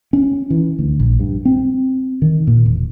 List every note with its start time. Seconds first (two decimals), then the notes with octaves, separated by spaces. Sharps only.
0.13 C#4
0.50 E3
0.79 D2
1.00 A#1
1.20 G2
1.45 C4
2.22 D#3
2.47 A#2
2.66 E1